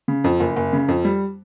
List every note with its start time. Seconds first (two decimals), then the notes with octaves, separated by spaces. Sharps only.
0.08 C#3
0.24 F2
0.40 F#1
0.56 F#1
0.73 C#3
0.88 F2
1.04 G3